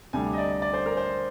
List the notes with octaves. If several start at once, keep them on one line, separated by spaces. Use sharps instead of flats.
D2 C3 G3 D4 G#5
D#5
D5
D5
C5
A#4
C5